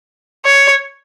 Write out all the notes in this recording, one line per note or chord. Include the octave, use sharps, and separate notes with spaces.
C#5